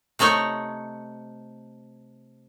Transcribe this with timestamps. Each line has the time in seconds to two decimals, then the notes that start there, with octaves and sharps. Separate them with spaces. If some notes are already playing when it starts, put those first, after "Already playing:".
0.19 C3 A3 D#4 C#5